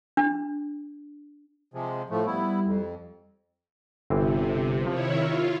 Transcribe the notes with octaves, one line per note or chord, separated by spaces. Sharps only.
D4
C3 F3 G#3
A2 F3 A3
G3 B3 E4
F2
G1 C3 E3 C4
D#3 F3 E4 C#5
F4 A#4 E5